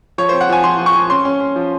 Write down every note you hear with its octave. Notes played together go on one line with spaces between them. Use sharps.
F3 C#5
C4 C5
F#5
F3 G#5
F3 C6
F3
C#6
F3
C#4 C6
C#4
C#4
F3